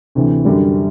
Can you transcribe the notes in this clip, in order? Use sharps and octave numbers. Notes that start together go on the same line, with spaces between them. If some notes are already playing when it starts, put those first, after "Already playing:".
D2 C3 E3
F#2 D3 G3